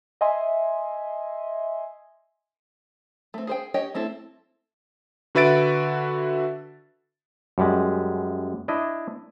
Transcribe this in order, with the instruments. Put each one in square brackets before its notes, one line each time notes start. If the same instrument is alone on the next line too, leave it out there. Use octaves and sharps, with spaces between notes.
[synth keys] D#5 E5 G#5 C6
[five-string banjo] A3 C4
G#4 C5 G5
G4 C#5 D#5 G5
A3 C4 E4 A4
[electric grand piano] D3 F#4 B4 E5 A6 D7
[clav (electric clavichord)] F#2 G3 G#3
D4 E4 D#5